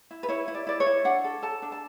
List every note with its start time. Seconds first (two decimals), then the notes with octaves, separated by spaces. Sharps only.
0.11 E4
0.23 B4
0.29 E4 C#5
0.48 E4
0.55 D5
0.67 E4 D5
0.80 C#5
0.86 E4
1.05 D4 F#5
1.24 A4
1.42 A4 A5
1.62 D4
1.72 A5